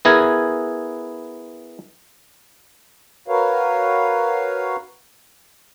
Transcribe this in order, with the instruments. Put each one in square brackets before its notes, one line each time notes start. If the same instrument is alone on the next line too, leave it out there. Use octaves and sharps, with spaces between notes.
[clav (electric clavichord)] B3 E4 G#4 A#4 G#5
[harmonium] F#4 A#4 B4 C#5 F5